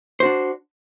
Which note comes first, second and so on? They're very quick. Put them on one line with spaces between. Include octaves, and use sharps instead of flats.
C5 F#4 D4